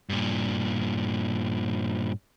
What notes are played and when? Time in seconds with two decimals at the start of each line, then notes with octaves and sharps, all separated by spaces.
0.09 G2 A#2